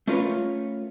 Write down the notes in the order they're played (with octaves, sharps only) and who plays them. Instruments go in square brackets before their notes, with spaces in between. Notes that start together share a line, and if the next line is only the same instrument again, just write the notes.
[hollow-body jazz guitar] A3 C#4 F4 A#4 B4 C#5